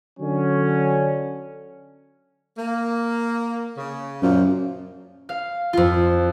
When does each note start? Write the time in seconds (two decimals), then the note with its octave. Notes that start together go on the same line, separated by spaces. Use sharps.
0.20 D3 F#3 C#4
2.57 A#3
3.78 C#3
4.23 F#2 A#2 F3
5.29 F5
5.73 F2 F4